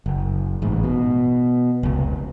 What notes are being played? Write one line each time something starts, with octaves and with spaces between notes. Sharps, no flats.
F#1
A1 G#2
B2
F1 C#2